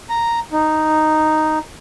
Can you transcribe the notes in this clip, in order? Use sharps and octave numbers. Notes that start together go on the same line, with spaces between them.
A#5
D#4